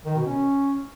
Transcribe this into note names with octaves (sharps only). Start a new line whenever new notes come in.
D#3
B2
C#4